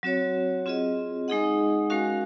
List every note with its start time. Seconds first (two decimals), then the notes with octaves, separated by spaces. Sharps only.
0.03 F#3 C4 F#4 C#5
0.66 C4 F4 G#4 D#5
1.28 G#3 D#4 G#4 D#5 F#5
1.90 G#3 C#4 F#4 A#4 F5